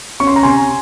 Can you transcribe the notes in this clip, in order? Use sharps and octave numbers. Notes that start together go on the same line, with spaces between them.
C#4 C#6
C6
A#5
C3 G#5 C6